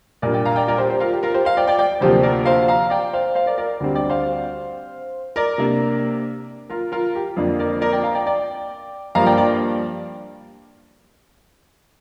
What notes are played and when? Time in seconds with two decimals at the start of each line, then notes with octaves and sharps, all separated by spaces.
0.22 A#2 G3 A#3 D4 A#4 D5
0.34 D5 G5
0.45 F5 A#5
0.56 D5 G5
0.68 A#4 D5
0.78 G4 C5
0.90 G4 C5
1.00 F4 A#4
1.13 G4
1.23 F4 A#4
1.34 G4 C5
1.45 C5 F5
1.57 D5 G5
1.67 D5 G5
1.79 D5 G5
2.01 D2 C3 F3 A#3 G4 C5
2.23 A#4 D5
2.45 C5 F5
2.68 F5 A#5
2.90 D5 G5
3.13 C5 F5
3.35 C5 F5
3.46 A#4 D5
3.58 A#4 D5
3.80 D2 D3 G3 C4
3.95 D5 G5
4.10 C5 F5
5.36 A#4 D5
5.58 C3 A#3 D4
6.70 F4 A#4
6.92 F4 A#4
7.15 G4
7.37 F2 D3 A#3 D4 F4
7.59 A#4 D5
7.81 A#4 D5
7.92 D5 G5
8.03 F5 A#5
8.15 D5 G5
8.26 D5 G5
9.15 G2 F3 A#3 D4 F5 A#5
9.26 D5 G5
9.37 D5 G5